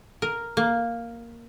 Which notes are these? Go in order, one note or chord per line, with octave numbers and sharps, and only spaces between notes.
A#4
A#3